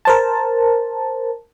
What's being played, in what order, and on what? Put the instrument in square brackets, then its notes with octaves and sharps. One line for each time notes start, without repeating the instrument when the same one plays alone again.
[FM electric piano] A#4 C5 A5